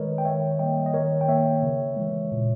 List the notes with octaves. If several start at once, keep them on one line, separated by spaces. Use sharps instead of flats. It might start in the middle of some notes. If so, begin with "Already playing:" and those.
Already playing: D#3 G#3 A#4 B4 C#5 D#5
G5
D#3 C#5 E5
G3 A#3 D#5 G5
D#5
D#3 A#4 C#5
G5
A#3 C#5 E5
C#3
E3 G#3
A#2